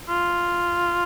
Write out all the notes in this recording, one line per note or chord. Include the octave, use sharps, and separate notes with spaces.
F4